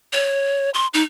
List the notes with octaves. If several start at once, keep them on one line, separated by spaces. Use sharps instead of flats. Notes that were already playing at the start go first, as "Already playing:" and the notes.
C#5
C6
D#4